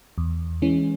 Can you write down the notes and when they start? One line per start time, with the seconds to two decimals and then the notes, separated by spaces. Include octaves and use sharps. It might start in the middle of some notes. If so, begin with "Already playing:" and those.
0.18 E2
0.62 E3 G#3 C#4